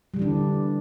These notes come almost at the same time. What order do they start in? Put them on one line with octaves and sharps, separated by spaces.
G3 D3 E3 D4